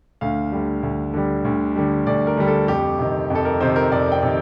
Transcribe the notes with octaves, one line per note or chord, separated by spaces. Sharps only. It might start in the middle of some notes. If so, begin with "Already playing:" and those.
D2 F5
D3 G3
D2
D3 G3
D2
D3 G3
D2 D5
A#4
D3 G3
A4
F2 G4
C3 D#3
F2
A4
A#4
C3 D#3 C5
A#4
F2 D5
G5
C3 D#3